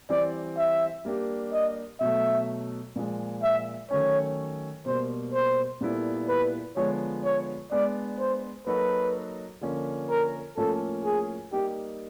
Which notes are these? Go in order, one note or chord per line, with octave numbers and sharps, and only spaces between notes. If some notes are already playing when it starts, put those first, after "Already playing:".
E3 G3 C4 D5
E5
G3 A#3 D4 G4
D#5
B2 F#3 A3 E5
A#2 F3 G#3
E5
D#3 F#3 A3 C#4 C#5
B2 G3 A#3 C5
C5
A#2 G3 B3 E4 A4
B4
D3 F3 G#3 B3 C#5
C#5
G#3 B3 D4 D5
C5
F#3 A#3 D#4 F#4 A4 B4
D3 F3 A#3 C#4
A#4
A2 F3 A#3 C#4 F4 A4
G#4
G3 A#3 D#4 G4